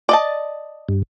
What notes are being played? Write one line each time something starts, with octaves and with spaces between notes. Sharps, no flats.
D5 D#5 A5
G2